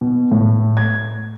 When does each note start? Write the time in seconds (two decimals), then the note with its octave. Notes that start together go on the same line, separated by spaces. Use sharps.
0.01 B2
0.31 A2
0.77 G#6